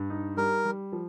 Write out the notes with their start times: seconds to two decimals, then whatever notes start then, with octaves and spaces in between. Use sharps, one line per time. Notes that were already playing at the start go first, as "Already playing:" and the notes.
Already playing: G2
0.10 D#4
0.37 G3 A#4
0.65 G3
0.92 F3